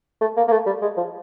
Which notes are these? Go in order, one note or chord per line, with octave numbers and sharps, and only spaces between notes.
A3
A#3
A#3
A3
G3
G#3
F3